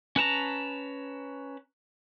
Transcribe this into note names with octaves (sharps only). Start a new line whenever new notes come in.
C#4 B4 A5 A#5